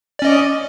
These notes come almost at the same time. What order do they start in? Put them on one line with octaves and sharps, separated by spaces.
D5 C#4 D#5